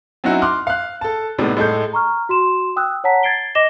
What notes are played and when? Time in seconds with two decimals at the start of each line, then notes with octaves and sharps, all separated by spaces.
0.24 F#3 C4 C#4 D#4 E4 F#4
0.42 C6 D6 F6 F#6
0.67 F5 F#6
1.01 A4 A5
1.38 A2 C3 G3 G#3 B3 D#4
1.57 A2 G#3 A4 G6
1.93 A#5 C#6 F6
2.29 F#4 C6 E7
2.76 G5 D#6 E6 F#6
3.04 C#5 F#5 A5 A#5 B6
3.23 G#6 A6 C7 D7 G7
3.55 D#5 D6 A#6 E7 G7